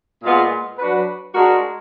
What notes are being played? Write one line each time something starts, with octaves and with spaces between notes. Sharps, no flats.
A#2 G#3 B3 F4 G#4
F#3 D4 F#4 B4
G#3 D4 F#4 A#4